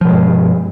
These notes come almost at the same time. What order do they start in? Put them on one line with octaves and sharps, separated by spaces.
F3 B2 G#3 G2